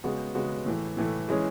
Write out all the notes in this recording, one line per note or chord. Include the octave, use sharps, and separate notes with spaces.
C#3 G#3 B3 F#4
C#3 G#3 B3 F#4
A2 E3 A3
A2 E3 A3
E3 G#3 C#4 G#4